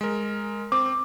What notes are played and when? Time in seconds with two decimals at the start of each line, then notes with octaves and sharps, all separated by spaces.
0.01 G#3 A#4
0.72 C4 D6